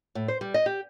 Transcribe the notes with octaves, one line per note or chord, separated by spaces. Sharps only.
A2
C5
G3
D#5
G4